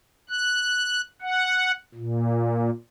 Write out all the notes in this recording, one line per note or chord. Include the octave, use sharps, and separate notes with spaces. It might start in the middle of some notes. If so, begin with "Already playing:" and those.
F#6
F#5
A#2